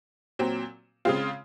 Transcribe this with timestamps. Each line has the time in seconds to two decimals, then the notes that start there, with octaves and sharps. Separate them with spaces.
0.39 A#2 F#3 C4
1.05 C#3 G#3 C4 F4